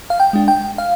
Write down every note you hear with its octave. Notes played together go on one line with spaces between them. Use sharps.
F5
G5
G#3 D4
G5
F5